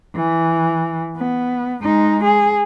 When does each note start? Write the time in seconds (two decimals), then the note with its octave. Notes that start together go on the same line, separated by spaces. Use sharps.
0.16 E3
1.18 B3
1.83 G#3 D#4
2.25 G#4